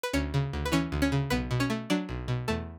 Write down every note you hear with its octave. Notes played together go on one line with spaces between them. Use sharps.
B4
D2 C#4 C#5
C#3
D2
B4
E3 C#4 C#5
D2
C#4 C#5
C#3
B1 B3 B4
B2
C#4 C#5
A3
F#3 D4 D5
B1
B2
E2 A3 A4